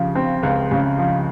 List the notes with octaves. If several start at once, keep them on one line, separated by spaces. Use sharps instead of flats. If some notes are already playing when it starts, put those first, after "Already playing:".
Already playing: C#3 F3
C4
C#2
C#3
F3